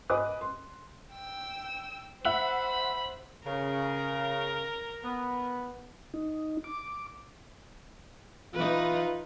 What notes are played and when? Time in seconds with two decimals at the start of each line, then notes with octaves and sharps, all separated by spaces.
0.10 B4 D#5 G#5 D6 D#6 F#6
0.41 C6
1.13 G5 E6
2.25 C5 E5 F#5 B5 F#6
3.45 C#3 A#4
5.05 B3
6.14 D#4
6.64 D6
8.54 E3 D#4 F4 B4